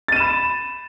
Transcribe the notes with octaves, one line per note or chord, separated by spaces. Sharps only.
B5 A6 D#7 E7